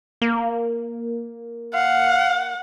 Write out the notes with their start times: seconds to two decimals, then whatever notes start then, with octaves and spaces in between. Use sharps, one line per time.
0.22 A#3
1.74 F5 F#5